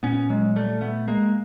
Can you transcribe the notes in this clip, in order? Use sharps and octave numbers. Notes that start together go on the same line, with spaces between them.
A#2 B3 C#4
F#3 G#3
G3 A3
A3 B3
G#3 A#3